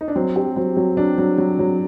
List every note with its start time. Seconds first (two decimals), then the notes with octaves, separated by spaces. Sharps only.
0.01 D#4
0.08 D4
0.15 F#3 C4
0.36 G4
0.56 F#3 C4
0.77 F#3
0.97 F#3 D4
1.18 F#3
1.38 F#3
1.59 F#3